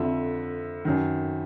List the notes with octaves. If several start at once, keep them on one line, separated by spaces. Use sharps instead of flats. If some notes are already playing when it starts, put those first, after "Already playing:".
Already playing: F2 D3 E5
F#2 D#3